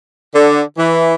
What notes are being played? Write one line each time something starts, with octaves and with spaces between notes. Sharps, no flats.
D3
E3